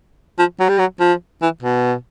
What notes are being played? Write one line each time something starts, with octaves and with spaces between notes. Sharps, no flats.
F3
F#3
G3
F#3
F3
E3
B2